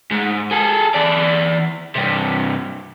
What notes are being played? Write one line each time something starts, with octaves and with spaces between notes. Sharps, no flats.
G#2
G#4 A4
E3 D5
G2 C3